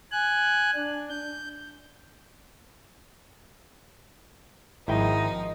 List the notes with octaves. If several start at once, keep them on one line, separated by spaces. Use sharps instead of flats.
G#5 F#6
D4
G6
G#1 F3 D#4 E4 G5